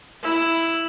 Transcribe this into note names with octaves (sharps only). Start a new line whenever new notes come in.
E4